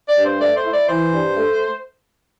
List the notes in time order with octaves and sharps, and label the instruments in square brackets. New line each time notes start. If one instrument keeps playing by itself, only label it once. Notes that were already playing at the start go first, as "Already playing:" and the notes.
[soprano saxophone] D5
[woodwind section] G2
[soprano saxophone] C5
[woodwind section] A3 [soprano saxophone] D5
[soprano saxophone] C5
[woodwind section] E4
[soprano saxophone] D5
[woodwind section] E3 [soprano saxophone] C5
[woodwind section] G2
A3